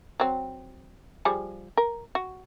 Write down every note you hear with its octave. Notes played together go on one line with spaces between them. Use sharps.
F#3 C4
F3 G3 G#4
A#4
F#4